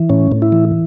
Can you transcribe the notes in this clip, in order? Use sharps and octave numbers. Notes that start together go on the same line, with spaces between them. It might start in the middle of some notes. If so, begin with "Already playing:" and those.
Already playing: E3
A2 C#4
A2
E4
E3